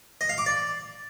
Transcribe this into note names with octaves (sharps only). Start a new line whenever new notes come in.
D#5
F5
D6
D5